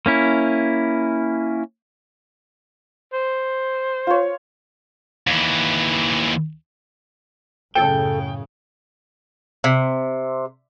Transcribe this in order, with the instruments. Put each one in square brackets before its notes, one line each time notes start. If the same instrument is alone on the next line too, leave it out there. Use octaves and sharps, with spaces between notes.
[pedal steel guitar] A#3 C#4 E4
[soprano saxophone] C5
[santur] F4 C#5
[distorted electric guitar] D#2 E3
[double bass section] F#2 A2 C#3 [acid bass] A4 [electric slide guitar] G5
[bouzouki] C3